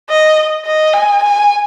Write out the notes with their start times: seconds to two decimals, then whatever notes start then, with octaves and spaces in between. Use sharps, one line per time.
0.09 D#5
0.66 D#5
0.94 G#5
1.23 G#5